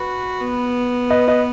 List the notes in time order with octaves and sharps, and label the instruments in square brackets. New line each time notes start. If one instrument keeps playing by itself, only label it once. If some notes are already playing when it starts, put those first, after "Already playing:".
Already playing: [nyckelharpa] F#4 [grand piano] B4
[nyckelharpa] B3
[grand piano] B4 D#5
B4 D#5